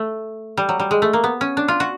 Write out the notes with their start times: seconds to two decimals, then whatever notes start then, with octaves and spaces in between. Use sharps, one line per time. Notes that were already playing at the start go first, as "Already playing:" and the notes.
Already playing: A3
0.57 G3
0.69 F#3
0.79 G3
0.91 G#3
1.02 A3
1.13 A#3
1.24 B3
1.41 C#4
1.57 D4
1.68 F4
1.80 F#4